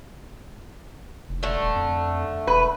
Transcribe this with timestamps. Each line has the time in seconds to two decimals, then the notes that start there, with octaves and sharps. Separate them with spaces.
1.29 F1
1.43 D3 A3
1.58 D#1
1.76 F2
2.47 E1 B4